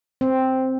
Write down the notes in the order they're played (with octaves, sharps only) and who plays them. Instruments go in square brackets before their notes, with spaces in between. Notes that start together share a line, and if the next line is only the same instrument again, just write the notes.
[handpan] C4